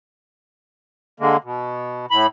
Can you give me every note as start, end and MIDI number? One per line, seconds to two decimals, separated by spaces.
1.20 1.37 50
1.20 1.37 56
1.20 1.37 58
1.44 2.06 47
2.11 2.27 45
2.11 2.27 83